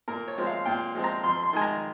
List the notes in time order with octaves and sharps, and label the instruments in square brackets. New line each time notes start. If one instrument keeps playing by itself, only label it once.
[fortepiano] A#2 A#4
C#5
F3 G#3 C4
F5
A#2 G5
F3 G#3 C4
A#5
F2 C6
C6
D#3 G#3 G#5
A#5